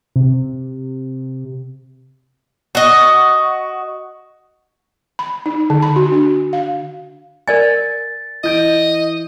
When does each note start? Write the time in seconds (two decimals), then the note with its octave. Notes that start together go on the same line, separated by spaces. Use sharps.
0.16 C3
2.75 F#4 D#5
5.19 B5
5.46 D#4
5.70 D3
5.82 B5
5.96 F#4
6.12 D4
6.53 F5
7.48 A#4 D5 G#5 A6
8.44 E3 D#5 G6 D7